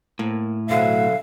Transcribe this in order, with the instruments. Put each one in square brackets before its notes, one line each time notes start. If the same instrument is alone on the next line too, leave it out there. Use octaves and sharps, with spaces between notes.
[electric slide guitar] A2 [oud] A#3
[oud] B2 D3 F#3 [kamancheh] E5 [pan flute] F5